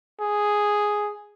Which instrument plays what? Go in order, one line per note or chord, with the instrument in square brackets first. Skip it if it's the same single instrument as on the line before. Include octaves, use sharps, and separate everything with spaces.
[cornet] G#4